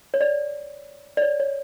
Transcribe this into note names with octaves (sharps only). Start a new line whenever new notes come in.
C#5
D5
D5
C#5
C#5